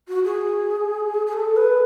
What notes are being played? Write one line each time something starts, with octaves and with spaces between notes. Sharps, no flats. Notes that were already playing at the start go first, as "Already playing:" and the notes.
F#4
G#4
G#4
A4
B4